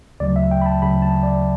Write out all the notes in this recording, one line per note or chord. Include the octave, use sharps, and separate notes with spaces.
D2 C#3 F#3 D5
E5
G5
B5
A5
D2 C#3 F#3 B5
A5
D5